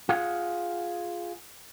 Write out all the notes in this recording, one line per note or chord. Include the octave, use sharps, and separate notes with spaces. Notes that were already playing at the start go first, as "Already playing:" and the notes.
F4 G#4 F#5